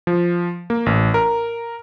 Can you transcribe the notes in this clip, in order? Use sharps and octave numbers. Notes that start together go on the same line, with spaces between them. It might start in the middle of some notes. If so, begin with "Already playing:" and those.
F3
A#3
A1
A#4